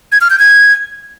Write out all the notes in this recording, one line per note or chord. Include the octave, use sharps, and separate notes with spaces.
G#6
F6
G6
G#6